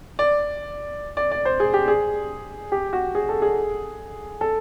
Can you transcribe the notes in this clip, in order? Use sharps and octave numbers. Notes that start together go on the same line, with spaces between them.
D5
D5
D5
C5
G#4
G4
G#4
G4
F#4
G#4
A4
G#4
A4